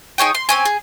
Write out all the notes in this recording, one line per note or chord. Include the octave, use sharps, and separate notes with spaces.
D#4 G#4 C#5 G5
C6
C4 C#4 G#5
G#4